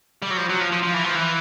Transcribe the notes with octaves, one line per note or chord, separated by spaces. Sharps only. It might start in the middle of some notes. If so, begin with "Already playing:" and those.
G3
F#3
F3
F#3
F3
F3
F3
E3
F3
E3